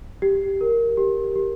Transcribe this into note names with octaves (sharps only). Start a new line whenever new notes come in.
G4
A#4
G4
G4